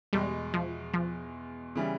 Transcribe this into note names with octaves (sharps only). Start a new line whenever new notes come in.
E2 B2 G3 G#3
F3
F3
C#3 E3 G3